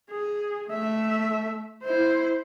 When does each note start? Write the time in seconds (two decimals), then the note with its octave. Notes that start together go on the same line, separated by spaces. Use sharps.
0.11 G#4
0.69 A3 E5
1.83 E4 C5